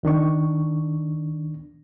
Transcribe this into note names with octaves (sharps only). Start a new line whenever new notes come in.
C#2 D#3 D4 C#6